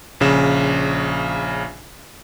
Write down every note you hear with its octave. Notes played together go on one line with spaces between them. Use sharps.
A#1 C#3 E7